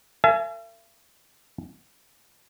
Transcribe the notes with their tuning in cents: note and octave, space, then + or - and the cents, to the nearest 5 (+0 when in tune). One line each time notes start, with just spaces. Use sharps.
A#4 -40 E5 +45 G#5 +30